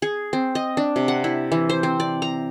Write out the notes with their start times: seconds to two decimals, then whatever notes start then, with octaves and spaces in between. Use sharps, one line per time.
0.02 G#4
0.33 C4
0.55 D#5
0.77 D4
0.96 C3
1.08 F#5
1.24 E4
1.52 E3
1.70 C5
1.83 C4
2.00 D5
2.22 A#5